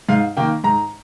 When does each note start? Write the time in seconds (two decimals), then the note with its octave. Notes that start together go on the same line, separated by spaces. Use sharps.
0.09 G#2 F5
0.37 D#3 A#3 G5
0.64 G#2 A#5